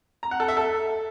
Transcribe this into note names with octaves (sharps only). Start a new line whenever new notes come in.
A#5
F#5
A4
E5
A4